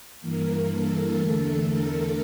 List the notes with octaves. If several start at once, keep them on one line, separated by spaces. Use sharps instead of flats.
G2 E3 A#3 A#4
A4
E2 D3 A3
A#4